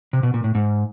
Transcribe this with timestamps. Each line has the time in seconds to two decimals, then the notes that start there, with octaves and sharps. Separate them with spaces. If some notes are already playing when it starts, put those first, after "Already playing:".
0.13 C3
0.23 B2
0.34 A#2
0.44 A2
0.55 G#2